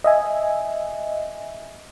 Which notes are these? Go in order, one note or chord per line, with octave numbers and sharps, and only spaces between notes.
D#5 E5 G#5